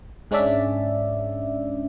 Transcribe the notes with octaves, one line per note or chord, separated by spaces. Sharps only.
G#2 G#3 C#4 D4 D5 E5